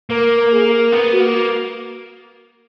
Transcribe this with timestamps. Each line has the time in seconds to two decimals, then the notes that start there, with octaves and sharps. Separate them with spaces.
0.10 A#3 A#4
0.37 A#4
0.53 G#4
0.65 A#4
0.92 B3 A#4
1.13 F#4
1.20 A#3